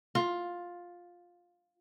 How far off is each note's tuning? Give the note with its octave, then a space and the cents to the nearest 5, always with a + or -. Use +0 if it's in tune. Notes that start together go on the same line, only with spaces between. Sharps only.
F4 +10